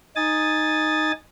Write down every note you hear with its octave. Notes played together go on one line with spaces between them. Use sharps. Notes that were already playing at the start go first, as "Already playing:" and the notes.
D#4 G#5 D#6 A6